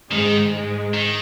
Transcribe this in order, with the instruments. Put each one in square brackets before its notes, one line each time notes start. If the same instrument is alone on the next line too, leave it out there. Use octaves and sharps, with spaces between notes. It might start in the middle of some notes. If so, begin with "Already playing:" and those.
[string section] G#2 G#3 [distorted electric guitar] D#3
[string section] G#2 G#3
[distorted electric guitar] D#3